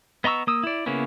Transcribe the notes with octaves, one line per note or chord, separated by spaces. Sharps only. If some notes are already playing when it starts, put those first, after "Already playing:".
B3 D#5 A#5 C#6 E6
A#3 D#6 E6
E4 D5
C#3 A#3 B3 C#4 E4